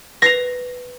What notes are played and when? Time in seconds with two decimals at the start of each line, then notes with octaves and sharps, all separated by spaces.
0.22 B4 A#6 C7 F7